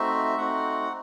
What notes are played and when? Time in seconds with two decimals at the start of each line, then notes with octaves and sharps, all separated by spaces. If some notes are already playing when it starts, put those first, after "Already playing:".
Already playing: A3 C4 D#4 F#4 E5
0.38 A3 C4 D#4 F#4 F#5